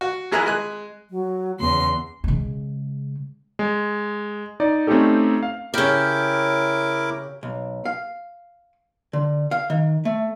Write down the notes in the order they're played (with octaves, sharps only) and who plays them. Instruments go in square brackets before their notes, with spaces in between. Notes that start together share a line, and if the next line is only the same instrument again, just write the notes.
[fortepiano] F#4
A#1 E4 G#4 G#5 A#5 F#6
G#3 G#5 F#6
[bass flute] F#3
[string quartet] E2 C6 [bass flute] C#3
[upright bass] C#3 G#3
[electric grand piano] G#3
D#4 D5
A3 C4 C#4 D#4 G4 A4
F5
[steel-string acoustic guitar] C#3 G4 [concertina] E4 A#4 D6
[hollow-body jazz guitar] B1
F5
D3
F5
D#3
A3